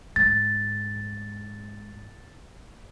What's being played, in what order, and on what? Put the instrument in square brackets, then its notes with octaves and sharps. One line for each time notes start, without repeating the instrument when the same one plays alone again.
[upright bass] G#2 [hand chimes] A6